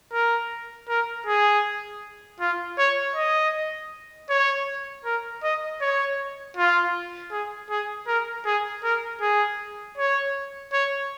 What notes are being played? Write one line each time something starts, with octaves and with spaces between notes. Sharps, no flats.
A#4
A#4
G#4
F4
C#5
D#5
C#5
A#4
D#5
C#5
F4
G#4
G#4
A#4
G#4
A#4
G#4
C#5
C#5